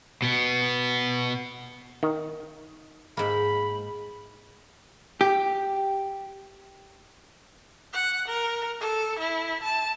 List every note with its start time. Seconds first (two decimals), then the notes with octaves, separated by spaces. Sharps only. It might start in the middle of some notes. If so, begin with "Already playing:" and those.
0.22 B2 B3
2.03 D#3
3.17 G#2 A#3 B5
5.21 G4
7.94 F#5
8.28 A#4
8.80 A4
9.19 E4
9.63 A5